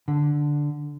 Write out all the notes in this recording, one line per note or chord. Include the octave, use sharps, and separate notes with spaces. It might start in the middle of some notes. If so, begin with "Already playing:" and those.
D3